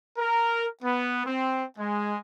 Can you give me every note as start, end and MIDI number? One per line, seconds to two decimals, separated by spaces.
0.18 0.66 70
0.83 1.22 59
1.26 1.65 60
1.79 2.17 56